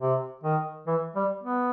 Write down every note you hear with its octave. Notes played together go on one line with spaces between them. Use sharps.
C3
D#3
E3
G3
B3